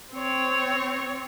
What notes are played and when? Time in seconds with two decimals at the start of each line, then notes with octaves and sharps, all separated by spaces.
0.13 C4 C#5